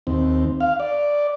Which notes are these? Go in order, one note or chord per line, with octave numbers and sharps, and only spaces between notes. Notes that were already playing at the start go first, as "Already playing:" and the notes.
D#2 C4
F5
D5